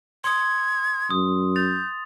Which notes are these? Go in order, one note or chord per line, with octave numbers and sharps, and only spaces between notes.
C6 D#6 G#6
F#2 D#6
G6 A6 F7